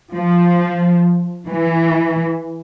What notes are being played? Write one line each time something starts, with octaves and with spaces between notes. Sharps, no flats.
F3
E3